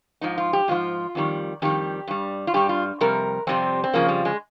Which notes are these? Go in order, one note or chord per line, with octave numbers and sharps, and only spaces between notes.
G#2 F3 D#4
F4
G4
G#2 F3 F4
F2 D#3 G3
F2 D#3 G3 G4
G2 G3
F4
G2 G3 G4
F4
F2 C3 G3 A#4
F2 C3 G3 C4
C4
F2 C#3 F3 A#3
G3
G#3